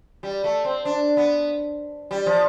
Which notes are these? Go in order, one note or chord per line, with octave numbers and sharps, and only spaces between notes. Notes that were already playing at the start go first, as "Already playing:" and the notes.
G3
A3
C4
D4
B3
G3
F3